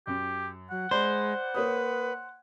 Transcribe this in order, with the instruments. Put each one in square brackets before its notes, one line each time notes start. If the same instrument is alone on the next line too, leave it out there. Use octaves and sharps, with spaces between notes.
[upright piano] F#2 [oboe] G4
[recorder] F#3 [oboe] F#5
[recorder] G#3 [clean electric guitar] C5 [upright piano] D5 B5
[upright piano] A#3 C#5 D#6 [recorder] B4